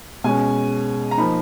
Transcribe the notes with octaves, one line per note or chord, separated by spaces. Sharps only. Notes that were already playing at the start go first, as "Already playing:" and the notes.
B2 G#3 C#4 G#5
A#5
F3 A#3 D#4 B5